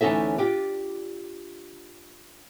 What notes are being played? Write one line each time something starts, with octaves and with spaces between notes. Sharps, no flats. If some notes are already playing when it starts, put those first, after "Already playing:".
D2 E3 C#4 D#4 A4 E5
D4 F4 G4